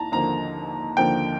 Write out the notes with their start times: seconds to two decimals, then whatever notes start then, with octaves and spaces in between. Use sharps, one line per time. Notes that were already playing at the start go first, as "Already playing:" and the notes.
Already playing: D#2 A5 A#5
0.12 D#2 D3 F3 A#3 A#5
0.97 D#2 D3 F3 A#3 G5